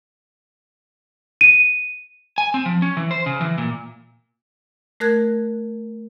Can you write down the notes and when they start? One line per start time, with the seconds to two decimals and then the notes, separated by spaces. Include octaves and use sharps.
1.41 D#7
2.38 G#5
2.54 C4
2.66 F3
2.82 C#4
2.97 E3
3.11 C5
3.26 C#3
3.41 E3
3.58 A#2
5.00 A3 A#4 F#6 G#6